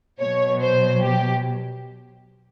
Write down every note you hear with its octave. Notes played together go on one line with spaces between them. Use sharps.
B2 F#3 C#5
C5
G4